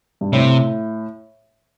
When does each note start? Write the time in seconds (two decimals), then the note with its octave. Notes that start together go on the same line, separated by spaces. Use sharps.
0.21 G2
0.33 A2 C3